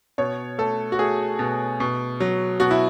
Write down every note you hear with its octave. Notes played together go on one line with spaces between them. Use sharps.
B2 C#5
A3 A4
F#4
A3 G#4
B2
B2
F#3
B2 F#4
E4